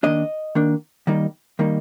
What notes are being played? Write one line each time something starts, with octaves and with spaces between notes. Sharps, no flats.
D#3 A#3 D4 D#5
D#3 A#3 D4
D#3 G3 A#3 D#4
D#3 G3 A#3 D#4